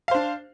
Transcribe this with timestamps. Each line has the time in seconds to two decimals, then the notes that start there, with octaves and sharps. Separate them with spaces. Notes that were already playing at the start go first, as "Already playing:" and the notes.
0.08 F5
0.11 C5
0.15 D4